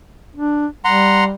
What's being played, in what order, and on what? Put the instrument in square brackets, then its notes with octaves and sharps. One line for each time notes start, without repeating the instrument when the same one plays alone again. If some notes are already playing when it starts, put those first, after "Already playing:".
[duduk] D4
[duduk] G3 [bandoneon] F#5 A#5 C6